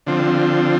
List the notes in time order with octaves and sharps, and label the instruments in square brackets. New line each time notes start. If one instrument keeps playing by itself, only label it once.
[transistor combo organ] D3 F3 C4